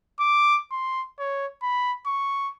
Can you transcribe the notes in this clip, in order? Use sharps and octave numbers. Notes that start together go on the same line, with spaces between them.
D6
C6
C#5
B5
C#6